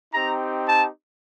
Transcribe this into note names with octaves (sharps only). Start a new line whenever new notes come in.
C4 D#4 G4 A#5
A5